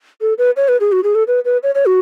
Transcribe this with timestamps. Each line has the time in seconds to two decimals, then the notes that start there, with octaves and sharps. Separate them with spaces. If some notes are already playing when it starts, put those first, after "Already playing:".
0.21 A4
0.38 B4
0.57 C#5
0.68 B4
0.80 G#4
0.92 F#4
1.04 G#4
1.15 A4
1.27 B4
1.45 B4
1.63 C#5
1.75 C#5
1.86 F#4